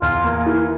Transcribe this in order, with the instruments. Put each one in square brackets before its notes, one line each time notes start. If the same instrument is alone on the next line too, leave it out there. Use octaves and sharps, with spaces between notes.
[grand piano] E2 [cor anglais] F4
[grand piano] A#3
E3